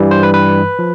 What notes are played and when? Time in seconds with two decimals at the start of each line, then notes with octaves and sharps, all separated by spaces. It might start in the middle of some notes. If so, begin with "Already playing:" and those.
Already playing: G2 E3 G3
0.11 C5
0.23 B4
0.34 B4
0.79 F3